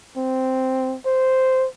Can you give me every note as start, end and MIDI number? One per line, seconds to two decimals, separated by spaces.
0.17 0.96 60
1.06 1.67 72